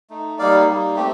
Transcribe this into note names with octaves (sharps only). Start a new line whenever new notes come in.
A3 D#4
G3 A#3 D#4 D5 F5
G3 A#3 D#4
A3 C4 G4